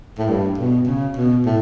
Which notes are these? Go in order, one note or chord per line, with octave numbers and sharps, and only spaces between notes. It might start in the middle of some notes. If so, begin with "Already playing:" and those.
A2
G2
B2
C#3
B2
A2